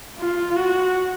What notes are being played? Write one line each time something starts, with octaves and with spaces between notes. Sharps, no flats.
F4
F#4